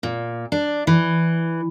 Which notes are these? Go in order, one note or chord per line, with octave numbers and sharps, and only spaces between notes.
A#2
D4
E3